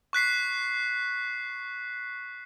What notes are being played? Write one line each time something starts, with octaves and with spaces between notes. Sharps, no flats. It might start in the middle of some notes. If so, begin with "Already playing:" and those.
C#6 F#6 B6 C7